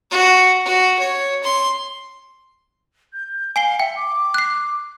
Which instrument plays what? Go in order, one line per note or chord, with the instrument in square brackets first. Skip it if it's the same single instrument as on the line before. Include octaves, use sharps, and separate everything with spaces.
[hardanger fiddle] F#4
F#4
C#5
C6
[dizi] G6
[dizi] F5 [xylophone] G#5 C7 G7
[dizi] E5 [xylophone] G5
[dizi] D6
[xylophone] F#6 C7